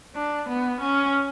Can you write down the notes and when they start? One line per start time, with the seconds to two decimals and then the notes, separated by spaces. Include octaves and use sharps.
0.15 D4
0.49 B3
0.80 C#4